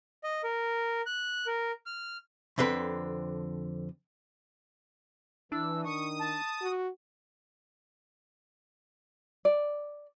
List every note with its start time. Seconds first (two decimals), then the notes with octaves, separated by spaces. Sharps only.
0.24 D#5
0.44 A#4
1.06 F#6
1.47 A#4
1.86 F6
2.58 F2 D3 C4 B4
5.52 E3 D4 E4 E6
5.84 D#3 C#6 D#6
6.19 A5
6.62 F#4
9.45 D5